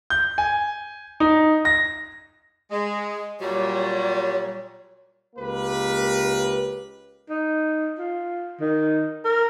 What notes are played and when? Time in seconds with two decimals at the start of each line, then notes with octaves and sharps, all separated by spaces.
0.10 G6
0.38 G#5
1.20 D#4
1.65 A#6
2.71 G#3
3.40 A#2 F#3 G3 C#5
5.36 C#2 A#3 G4 B4
7.29 D#4
7.98 F4
8.60 D#3
9.24 A#4